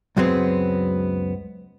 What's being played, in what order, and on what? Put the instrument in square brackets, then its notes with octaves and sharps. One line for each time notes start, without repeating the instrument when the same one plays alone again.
[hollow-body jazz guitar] C#2 F#2 F#3 G#3 B3 C4